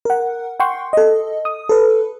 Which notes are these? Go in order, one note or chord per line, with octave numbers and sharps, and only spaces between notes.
A#4 F#5
F#5 G5 C6 C#6
A4 D#5
D#6
A4 B4